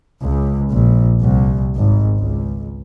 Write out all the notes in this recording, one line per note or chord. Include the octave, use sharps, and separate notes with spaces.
C#2
A#1
C2
G#1
C#2